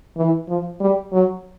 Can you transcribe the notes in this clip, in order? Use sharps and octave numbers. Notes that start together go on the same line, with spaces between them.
E3
F3
G3
F#3